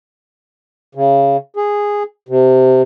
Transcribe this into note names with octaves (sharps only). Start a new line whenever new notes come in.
C#3
G#4
C3